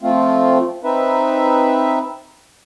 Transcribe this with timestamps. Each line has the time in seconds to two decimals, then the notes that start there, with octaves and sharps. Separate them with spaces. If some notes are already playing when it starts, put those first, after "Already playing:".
0.03 F3 A3 C4 F4
0.84 C4 D#4 B4 E5